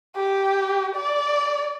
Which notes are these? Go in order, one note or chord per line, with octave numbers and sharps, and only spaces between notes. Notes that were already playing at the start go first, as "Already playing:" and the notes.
G4
D5